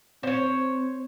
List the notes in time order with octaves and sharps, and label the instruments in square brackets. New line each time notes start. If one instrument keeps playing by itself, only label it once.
[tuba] C4 [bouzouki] C5 C#5